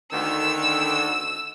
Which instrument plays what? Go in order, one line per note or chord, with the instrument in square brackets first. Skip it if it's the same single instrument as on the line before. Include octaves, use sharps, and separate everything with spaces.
[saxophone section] D2 D3 D#3 [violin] E6